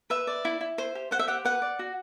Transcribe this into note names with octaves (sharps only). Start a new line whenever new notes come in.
B4 E5
D5
E4
E4
C5
G4
C5 F#5
E5
G4 F#5
B4 F#5
D5
F#4